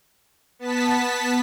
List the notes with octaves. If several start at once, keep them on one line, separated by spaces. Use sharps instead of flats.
B3 A5 B6